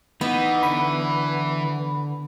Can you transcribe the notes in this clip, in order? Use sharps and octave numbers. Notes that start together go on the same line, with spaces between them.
E3 B3 D#4
D3 B5